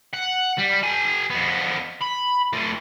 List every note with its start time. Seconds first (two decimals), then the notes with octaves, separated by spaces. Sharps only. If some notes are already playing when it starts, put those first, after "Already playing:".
0.13 F#5
0.58 G3
0.83 G4 G#5
1.30 F2 B3
2.01 B5
2.53 A3 F4